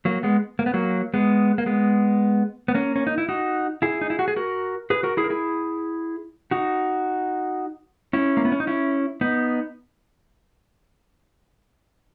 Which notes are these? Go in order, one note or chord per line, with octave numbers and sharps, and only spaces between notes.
F#3 A#3
G#3 B3
A#3
B3
F#3 A#3
G#3 B3
A#3
G#3 B3
B3
A#3 C#4
C#4
D#4
E4
D#4 F#4
E4 G#4
D#4
E4
F#4
G#4
F#4 A#4
G#4 B4
F#4 A#4
E4 G#4
A#4
E4 G#4
D#4 F#4
C#4 E4
A#3
B3
C#4
D#4
C#4 E4
B3 D#4